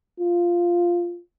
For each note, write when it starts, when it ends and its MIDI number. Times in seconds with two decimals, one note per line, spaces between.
0.20 1.20 65